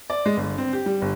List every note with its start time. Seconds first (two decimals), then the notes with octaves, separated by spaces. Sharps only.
0.10 D5
0.26 G#3
0.37 G1
0.58 C4
0.73 G4
0.86 G3
1.02 G1